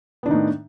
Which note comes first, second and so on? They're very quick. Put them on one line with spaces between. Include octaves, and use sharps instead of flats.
B3 D4 D#3 D#4 A2